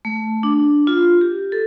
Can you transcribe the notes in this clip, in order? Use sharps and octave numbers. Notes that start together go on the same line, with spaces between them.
A3
D4
F4
G4
A4